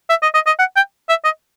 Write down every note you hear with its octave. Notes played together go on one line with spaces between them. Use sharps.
E5
D#5
D#5
D#5
F#5
G5
E5
D#5